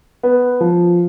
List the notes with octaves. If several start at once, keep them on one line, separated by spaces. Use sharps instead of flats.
B3
F3